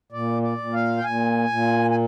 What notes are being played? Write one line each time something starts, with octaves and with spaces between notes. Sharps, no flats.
A#2 D5
D5
A#2
F5
G5
A#2 G#5
A#2
G#5